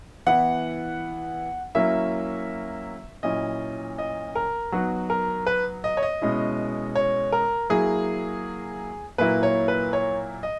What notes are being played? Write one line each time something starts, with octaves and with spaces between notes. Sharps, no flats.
E3 B3 E4 F#5
F#3 A#3 C#4 E4 E5
A#2 F#3 C#4 E4 D#5
D#5
A#4
F#3 B3 D#4 F#4
A#4
B4
D#5
C#5
D#5
B2 G#3 C#4 E4
C#5
A#4
F#3 A#3 E4 G#4
A#2 F#3 A#3 E4 B4
C#5
B4
C#5
D#5